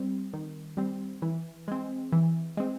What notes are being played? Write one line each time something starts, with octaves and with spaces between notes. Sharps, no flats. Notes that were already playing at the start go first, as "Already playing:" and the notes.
Already playing: G3 C4
D#3
G3 C4
E3
G#3 C4
E3
G#3 C4